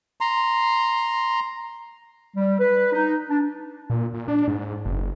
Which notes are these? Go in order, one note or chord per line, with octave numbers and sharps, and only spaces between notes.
A#5 C6
G3
B4
D#4
D4
A#2
A#2
D4
G#2
F#1